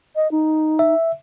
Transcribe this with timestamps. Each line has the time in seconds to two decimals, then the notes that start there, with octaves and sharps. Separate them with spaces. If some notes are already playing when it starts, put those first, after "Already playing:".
0.16 D#5
0.31 D#4
0.79 E5